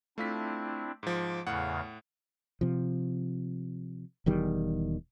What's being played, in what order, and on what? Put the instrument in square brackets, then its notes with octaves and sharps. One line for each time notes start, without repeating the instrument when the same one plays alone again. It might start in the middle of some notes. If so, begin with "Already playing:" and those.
[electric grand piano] A3 F4 B6 [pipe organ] C4 D4 E4
[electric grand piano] G#2 F3 [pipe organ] D6
[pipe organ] E2 C#3 F5 [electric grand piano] A2 F#5
[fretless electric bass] C3 F3
E1 E2 D#3 G3